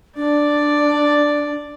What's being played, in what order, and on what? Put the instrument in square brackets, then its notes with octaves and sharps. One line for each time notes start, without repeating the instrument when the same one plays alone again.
[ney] D4 [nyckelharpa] D5